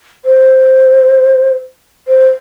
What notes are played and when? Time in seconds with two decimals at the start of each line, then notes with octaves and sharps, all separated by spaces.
0.24 C5
2.07 C5